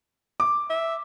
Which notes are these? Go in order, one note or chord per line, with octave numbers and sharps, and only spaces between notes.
D6
E5